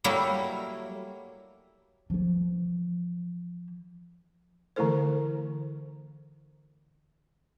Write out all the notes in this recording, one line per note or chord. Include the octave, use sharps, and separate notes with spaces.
F#3 G3 A3 A#3 E4
E3 F3
D3 E3 A3 E4 A4 C5